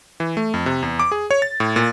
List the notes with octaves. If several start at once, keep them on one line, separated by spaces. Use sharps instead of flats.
E3
A3
F2
C3
E2
D6
G#4
C#5
A6
A2
A#2